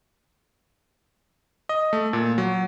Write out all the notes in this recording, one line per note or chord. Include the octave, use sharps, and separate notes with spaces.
D#5
A3
A#2
F#3